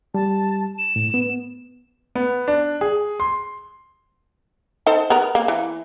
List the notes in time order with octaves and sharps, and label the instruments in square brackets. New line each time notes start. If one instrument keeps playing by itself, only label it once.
[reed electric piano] G3 [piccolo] A5
[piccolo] E7
[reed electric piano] A2
B3
[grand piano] B3
D4
G#4
C6
[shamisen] D#4 A4 C5
B3 A#4
A#3
E3